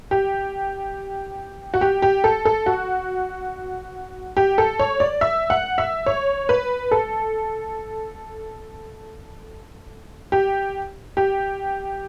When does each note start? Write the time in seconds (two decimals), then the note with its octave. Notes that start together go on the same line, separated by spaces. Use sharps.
0.11 G4
1.74 F#4
1.81 G4
2.02 G4
2.24 A4
2.45 A4
2.66 F#4
4.37 G4
4.58 A4
4.79 C#5
5.00 D5
5.21 E5
5.50 F#5
5.78 E5
6.06 C#5
6.49 B4
6.91 A4
10.32 G4
11.17 G4